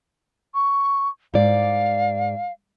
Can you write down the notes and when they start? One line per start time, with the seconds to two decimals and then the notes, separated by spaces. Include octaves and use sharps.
0.54 C#6
1.34 G#2 D5 F5